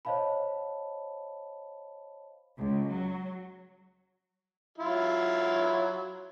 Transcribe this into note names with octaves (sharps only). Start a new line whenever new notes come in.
C5 C#5 D#5 F5 A5 B5
C#2
F#3
F#3 E4 F4